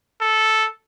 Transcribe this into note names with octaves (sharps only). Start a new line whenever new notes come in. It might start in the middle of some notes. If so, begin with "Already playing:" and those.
A4